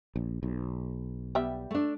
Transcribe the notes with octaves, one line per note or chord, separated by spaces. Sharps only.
A#1
B1
G3 B3 E5
A3 D4